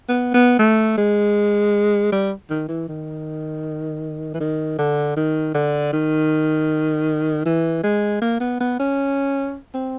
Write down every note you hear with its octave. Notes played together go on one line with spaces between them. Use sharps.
B3
B3
A3
G#3
G3
D#3
E3
D#3
E3
D#3
D3
D#3
D3
D#3
E3
G#3
A#3
B3
B3
C#4
C4